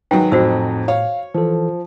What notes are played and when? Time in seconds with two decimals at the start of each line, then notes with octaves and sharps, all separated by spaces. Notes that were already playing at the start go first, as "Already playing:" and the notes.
0.11 G#2 D#3 F#3 B4 G5
0.32 F2 A2 F#4 C5 E6
0.88 C#5 F5
1.34 E3 F3 A4